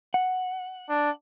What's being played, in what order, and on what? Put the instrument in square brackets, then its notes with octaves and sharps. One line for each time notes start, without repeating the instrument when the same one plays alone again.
[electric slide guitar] F#5
[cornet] D4